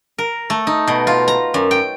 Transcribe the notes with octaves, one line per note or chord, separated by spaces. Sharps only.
A#4
A3
D#4
B2
F4
A#5
F#2
G5